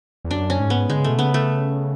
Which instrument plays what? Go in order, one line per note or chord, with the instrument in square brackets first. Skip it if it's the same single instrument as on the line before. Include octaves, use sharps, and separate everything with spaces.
[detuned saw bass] E2
[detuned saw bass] F#2 [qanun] D4
[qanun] C#4
[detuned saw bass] G#2
[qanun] B3
[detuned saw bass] D3 [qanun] G#3
[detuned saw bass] C#3
[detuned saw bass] B2 [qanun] A3
[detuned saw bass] C#3 [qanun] B3
[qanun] A3